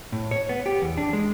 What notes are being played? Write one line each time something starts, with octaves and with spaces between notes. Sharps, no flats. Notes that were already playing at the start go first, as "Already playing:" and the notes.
A2
C#5
B3
G4
E2
D4
G#3